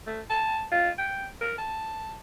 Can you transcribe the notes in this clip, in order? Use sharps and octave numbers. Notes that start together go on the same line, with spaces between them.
A3
A5
F4
G5
A#4
A5